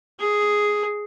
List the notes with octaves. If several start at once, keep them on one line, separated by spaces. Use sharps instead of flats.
G#4